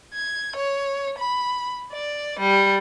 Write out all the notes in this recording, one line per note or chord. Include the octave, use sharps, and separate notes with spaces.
G#6
C#5
B5
D5
G3